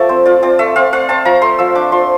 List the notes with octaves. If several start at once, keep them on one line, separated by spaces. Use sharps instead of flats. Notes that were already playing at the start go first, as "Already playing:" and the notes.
Already playing: F3 A3 D5 E5
C4 C5
F4 D5
C4 D5
A3 E5
C4 F5
A3 F5
C4 A5
F3 A#5
A3 C6
F3 E6
D4 D6
F3 C6